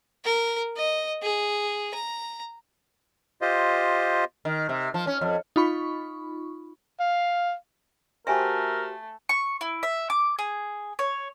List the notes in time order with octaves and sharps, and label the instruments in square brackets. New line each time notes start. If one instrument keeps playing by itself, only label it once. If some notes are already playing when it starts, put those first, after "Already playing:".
[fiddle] A#4
D#5
G#4
A#5
[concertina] F4 G4 C5 D#5
[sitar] D#3
C3
F3
C#4
F2
[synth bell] D#4 F4 B5 C#6
[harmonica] F5
[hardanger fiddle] A3 [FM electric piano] F#4 G4 C5 [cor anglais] A#4 [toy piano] E5 G#5
[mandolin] C#6
E4
E5
D6
G#4
C#5